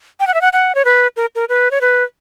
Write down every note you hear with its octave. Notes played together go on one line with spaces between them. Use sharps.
G5
F#5
E5
F#5
F#5
C#5
B4
A#4
A#4
B4
C#5
B4